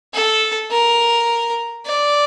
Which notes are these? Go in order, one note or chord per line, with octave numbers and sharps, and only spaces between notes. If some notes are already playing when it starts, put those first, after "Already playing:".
A4
A#4
D5